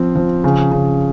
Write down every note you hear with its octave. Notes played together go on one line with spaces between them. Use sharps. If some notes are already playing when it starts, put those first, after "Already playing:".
Already playing: F3 C4
F3
C#3
C#3